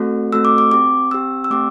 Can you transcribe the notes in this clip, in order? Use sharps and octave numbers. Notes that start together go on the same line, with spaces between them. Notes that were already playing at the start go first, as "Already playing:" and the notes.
Already playing: A3 C4 F#4 A4
A3 C4 F#4 A4 E6
D6
D6
C4 G4 D6
C4 G4 E6
E6
A3 C4 G4 D6